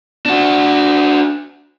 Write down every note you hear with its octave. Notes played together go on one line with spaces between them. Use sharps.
D4 F#4